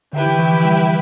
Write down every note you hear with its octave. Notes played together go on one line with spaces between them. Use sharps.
D3 E4 G4 B4 E5 G5
E3
E3
F3
G3